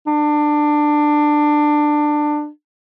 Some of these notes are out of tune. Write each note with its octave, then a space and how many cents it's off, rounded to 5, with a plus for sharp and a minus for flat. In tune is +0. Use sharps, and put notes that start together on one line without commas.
D4 +20